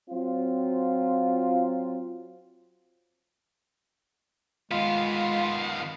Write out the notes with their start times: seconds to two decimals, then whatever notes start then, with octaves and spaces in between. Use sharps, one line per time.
0.10 F#3 C4 F4
4.72 D#3 G#3 B3 F4 F5